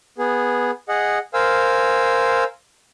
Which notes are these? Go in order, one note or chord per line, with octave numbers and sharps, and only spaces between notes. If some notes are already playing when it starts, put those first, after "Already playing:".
B3 G#4
G#4 D#5 F#5
A#4 C5 F5 G#5 E6